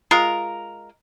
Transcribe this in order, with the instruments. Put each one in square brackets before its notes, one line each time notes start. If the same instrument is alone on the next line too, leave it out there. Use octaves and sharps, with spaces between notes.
[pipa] G#3 F4 A#4